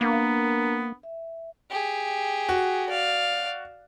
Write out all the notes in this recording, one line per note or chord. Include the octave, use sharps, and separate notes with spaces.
A#3 B3 D4 A#4 A#5
E5
G4 G#4
F#4
D5 F5